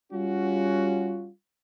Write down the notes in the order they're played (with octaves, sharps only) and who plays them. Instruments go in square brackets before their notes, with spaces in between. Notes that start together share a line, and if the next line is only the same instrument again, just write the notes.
[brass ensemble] G3 C#4 F4 F#4